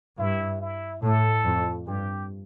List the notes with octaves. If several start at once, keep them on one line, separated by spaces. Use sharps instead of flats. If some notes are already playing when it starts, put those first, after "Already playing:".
G2 E4
E4
A2 A4
F2
G2 G4